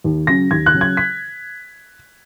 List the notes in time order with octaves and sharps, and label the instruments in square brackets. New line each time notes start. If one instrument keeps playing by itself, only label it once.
[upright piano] D#2
C#3 F#3 C#4 A#6
D#2 G#6
F#6
C#3 F#3 C#4
G#6
B6